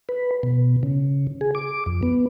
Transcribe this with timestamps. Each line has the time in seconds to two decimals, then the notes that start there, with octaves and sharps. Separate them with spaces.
0.09 B4
0.43 B2
0.83 C#3
1.41 G#4
1.55 D6
1.86 F2
2.03 B3